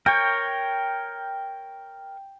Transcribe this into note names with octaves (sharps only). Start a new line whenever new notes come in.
A#4 C#5 G5